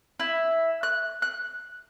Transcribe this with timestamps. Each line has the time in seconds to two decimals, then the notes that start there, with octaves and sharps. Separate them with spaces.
0.20 E4
0.83 F#6
1.22 F#6